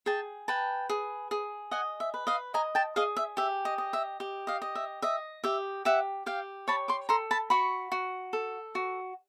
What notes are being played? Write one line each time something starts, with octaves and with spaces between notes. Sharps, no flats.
G#4 G5 A5
B4 G5 A5
G#4
G#4
D#5 F#5 G#5
E5
B4
D#5 F5
D#5 G#5 A#5
G5 A5
G#4 D#5 F5
E5
G4 E5
D#5
D#5
E5
G4
D#5 F5
D#5
E5
D#5 E5
G4 E5
G4 E5 F#5
G4 F5 G5
C#5 A5 B5
C6 D6
A4 A#5 C6
A5 B5
F#4 B5 C#6
F#4
A4
F#4